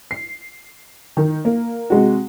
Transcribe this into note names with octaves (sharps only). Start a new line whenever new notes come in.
C7
D#3
A#3
C3 G#3 F#4